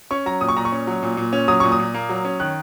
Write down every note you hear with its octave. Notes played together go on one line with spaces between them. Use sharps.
C#4 C#6
F#3 A#5
A#2 D#6
C#6
A#2 A#5
C#6
C#4
F#3
A#2
A#2
C#4
F#3 D#6
A#2 C#6
D#6
A#2
A#3
F#3
C#4
D#3 F#6